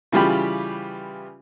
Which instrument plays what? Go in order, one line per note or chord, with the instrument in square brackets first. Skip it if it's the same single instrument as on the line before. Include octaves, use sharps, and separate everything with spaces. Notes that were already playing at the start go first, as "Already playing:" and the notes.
[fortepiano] C#3 E3 G3 F4 G4 B5